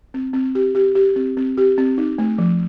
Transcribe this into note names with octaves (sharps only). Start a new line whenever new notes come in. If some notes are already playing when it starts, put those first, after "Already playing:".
C4
C4
G4
G4
G4
C4
C4
G4
C4
D#4
A3
F3